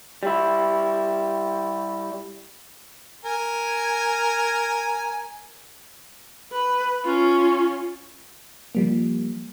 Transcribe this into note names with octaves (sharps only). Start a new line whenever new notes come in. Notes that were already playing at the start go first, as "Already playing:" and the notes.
G3 E4
A#4 G#5
B4
C#4 F4
F3 G3 A#3